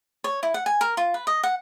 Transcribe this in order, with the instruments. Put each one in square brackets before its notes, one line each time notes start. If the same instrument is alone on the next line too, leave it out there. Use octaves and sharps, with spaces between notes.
[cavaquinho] C#5
E4
F#5
G#5
A#4
F4
B4
D#5
F#5